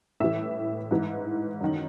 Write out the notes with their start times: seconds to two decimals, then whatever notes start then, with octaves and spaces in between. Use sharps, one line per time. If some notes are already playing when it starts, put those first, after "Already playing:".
0.20 A2 E3 E5
0.91 G#2 E3
1.61 F#2 D#3